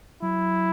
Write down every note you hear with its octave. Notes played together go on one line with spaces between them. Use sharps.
F#3 E4